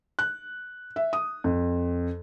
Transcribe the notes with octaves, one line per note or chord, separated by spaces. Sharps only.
F#6
E5
D#6
F2